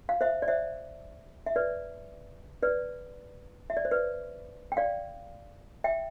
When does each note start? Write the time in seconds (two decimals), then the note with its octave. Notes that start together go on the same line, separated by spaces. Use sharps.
0.09 F5
0.21 C5 E5
0.42 D5
0.48 C5 E5
1.46 E5
1.56 B4 D5
2.63 B4 D5
3.70 E5
3.77 D5
3.85 C5
3.91 B4 D5
4.72 G5
4.77 D5 F5
5.84 E5 G5